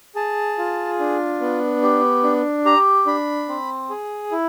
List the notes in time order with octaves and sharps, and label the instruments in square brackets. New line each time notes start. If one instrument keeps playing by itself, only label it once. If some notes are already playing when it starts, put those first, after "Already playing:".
[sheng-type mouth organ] G#4 A5
F4
D4
B3
G4
D4
G4 A#5
D4 B5
C4
G#4
E4